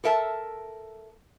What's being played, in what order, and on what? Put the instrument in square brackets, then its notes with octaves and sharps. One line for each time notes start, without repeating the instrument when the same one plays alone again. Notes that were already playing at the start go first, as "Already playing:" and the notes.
[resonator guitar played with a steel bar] A4 A#4 E5 A5